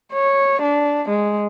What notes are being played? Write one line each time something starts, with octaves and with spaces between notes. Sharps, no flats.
C#5
D4
G#3